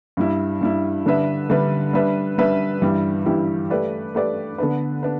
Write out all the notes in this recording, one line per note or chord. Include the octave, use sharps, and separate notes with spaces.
G2 G3 E4
G2 G3 E4
D3 G3 D4 B4 E5
D3 G3 D4 B4 E5
G3 D4 B4 E5
G3 D4 B4 E5
G2 E3 G3 E4 G4
G2 E3 G3 E4 G4
A3 G4 B4 D5
A3 G4 B4 D5
D3 B3 D4 B4
D4 B4